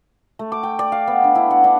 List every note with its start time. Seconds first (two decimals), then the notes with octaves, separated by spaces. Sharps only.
0.39 A3
0.52 D6
0.63 G5
0.79 D5
0.92 F5
1.07 B3
1.24 D4
1.35 E4
1.51 F#5
1.64 D4